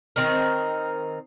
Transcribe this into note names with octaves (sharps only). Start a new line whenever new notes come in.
D#3 C4 D#4 A#4